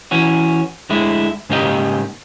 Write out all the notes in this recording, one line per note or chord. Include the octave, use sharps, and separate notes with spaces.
E3 C#4 F#4
D2 D3 G#3 E4
G#2 C#3 A#3 D#4 G4 D#5